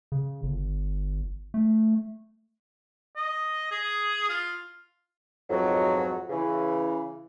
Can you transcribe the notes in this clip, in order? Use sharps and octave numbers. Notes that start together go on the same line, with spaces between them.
C#3
G1
A3
D#5
G#4
F4
F2 G#2 B2 F#3
C#3 E3